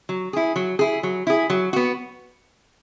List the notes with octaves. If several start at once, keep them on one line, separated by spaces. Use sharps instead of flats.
F#3
E4 G#4
F#3
E4 G#4
F#3
E4 G#4
F#3
B3 F#4